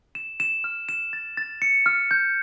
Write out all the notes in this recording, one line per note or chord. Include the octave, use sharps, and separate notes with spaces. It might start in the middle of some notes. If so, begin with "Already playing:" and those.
E7
E7
F6
E7
A6
A6
C#7
F6
G6